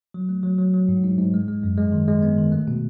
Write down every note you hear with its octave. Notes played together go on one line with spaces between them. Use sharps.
F#3
A3
F#3
F#3
F#3
G#2
G#2
G#2
G#3
G#3
F#2
G#3
D#3
G#3
B3
D#3
A3
B2